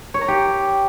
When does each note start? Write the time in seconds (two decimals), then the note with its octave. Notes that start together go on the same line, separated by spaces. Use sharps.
0.14 C#5
0.21 A#5
0.28 G4